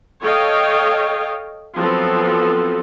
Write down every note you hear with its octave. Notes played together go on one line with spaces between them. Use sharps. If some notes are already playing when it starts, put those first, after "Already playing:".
A4 C#5 D#5 F5 G5
F3 F#3 B3 C4 A4